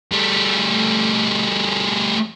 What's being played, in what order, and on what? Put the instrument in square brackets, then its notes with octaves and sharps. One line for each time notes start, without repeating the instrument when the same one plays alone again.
[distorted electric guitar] G3 A3